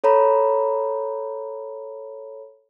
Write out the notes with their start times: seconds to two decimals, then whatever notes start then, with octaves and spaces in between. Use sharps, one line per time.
0.04 A4 C#5 A#5 B5